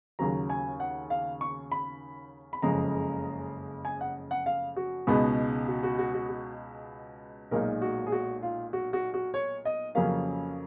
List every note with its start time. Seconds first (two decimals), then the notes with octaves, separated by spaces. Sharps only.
0.19 D#2 C#3 F#3 A#5
0.50 G#5
0.80 F#5
1.10 F5
1.41 C#6
1.72 B5
2.53 B5
2.62 F#1 F2 C#3 G#3 A#5
3.85 G#5
4.01 F#5
4.31 F#5
4.46 F5
4.76 F#4
5.07 C#2 B2 G#3 B3 D#4
5.68 F#4
5.83 F#4
5.99 F#4
6.14 F#4
6.29 F#4
7.51 B1 A#2 G#3 D#4 A#4
7.82 F#4
8.06 G#4
8.12 F#4
8.43 F4
8.73 F#4
8.93 F#4
9.14 F#4
9.34 C#5
9.65 D#5
9.95 F2 C#3 F#3 A#3 C#4 F5